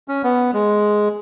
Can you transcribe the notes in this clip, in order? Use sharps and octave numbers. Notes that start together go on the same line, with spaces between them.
C#4
B3
G#3